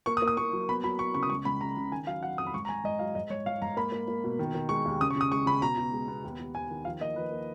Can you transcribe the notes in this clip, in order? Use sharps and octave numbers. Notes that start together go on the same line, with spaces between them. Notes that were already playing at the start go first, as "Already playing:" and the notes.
A#3 C#6
D#6
A#3
D#6
A#3 C#6
F#3
B3 B5
F#3 B5
B3 C#6
C#3 C#6
D#6
C#2 C#6
C#2 B5
C#3 A#5
C#3
D#3 G#5
F#3 F5
F#3 F#5
F2 D#6
B5
G#2 C#6
A#5
G#2 G#5
G#2 D#5
F#3 F5
G#2 D#5
G#2 C#5
G#2 F5
G#2 A#5
A#3 B5
A#3
A#3
B2
D#3
D#3
G#3 C#6
D#2
C#3 D#6
C#6
C#3 D#6
G#3 C#6
C#3 B5
B2 A#5
B2
G#3
B3
D#2
D#2
D#2 G#5
D#3
F3 F5
A#3 D#5
F3 B4
A#3